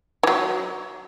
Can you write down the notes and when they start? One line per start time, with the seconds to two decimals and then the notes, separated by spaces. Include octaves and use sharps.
0.23 E3
0.27 F#3